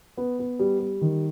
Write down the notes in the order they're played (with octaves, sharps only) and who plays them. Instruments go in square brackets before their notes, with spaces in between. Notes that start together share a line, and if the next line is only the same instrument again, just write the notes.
[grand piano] B3
B3
G3
G3
D#3